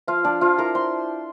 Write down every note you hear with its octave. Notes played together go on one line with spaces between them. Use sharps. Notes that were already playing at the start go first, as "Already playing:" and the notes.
F3 F4 F5
F3 D4 D5
F3 F4 F5
E4 A#4 A#5
C5 C6